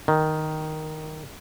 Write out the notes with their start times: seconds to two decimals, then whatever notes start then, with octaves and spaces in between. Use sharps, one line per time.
0.08 D#3